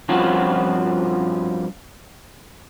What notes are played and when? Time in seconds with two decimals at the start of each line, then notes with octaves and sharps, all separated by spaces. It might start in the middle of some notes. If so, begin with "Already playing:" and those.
0.09 G2 F3 C4 C#4 F4 F#4